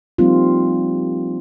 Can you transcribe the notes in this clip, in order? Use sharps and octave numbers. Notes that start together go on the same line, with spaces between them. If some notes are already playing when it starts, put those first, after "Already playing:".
F3 G3 A#3 C4 D#4 F4